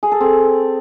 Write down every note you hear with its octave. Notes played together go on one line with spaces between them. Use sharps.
G#4
A4
C4